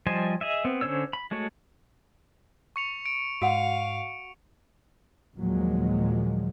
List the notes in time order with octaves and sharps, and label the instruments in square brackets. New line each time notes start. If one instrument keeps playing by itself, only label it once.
[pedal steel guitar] F3 G3 C5 D#5 G#5
G#4 D#5 E5
B3 C4
D3 C#4 C5 C#5 E6
B5
G#3 A3 F#4 C#5
[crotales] C#6 C#7 F7
D7
[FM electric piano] G#2 [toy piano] F#4 F#5 [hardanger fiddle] F5 [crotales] D7
[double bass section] D#2 A#2 D#3 F3 F#3 G#3